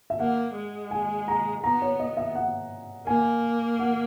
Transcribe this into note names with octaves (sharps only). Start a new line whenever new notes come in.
E5
A#3 F#5
G#3
G#5
A#5
B3 A#5
C#5
D#5
E5
F#5
A#3 G#5
F#5